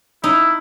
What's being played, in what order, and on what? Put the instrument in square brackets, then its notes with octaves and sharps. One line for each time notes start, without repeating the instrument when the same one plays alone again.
[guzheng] D#4 [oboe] E4